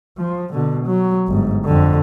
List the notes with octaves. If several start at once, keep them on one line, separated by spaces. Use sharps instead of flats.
F3
B2 D3
F#3
G1 G#2
F2 D3